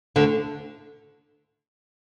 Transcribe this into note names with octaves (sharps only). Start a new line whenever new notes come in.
D2 D3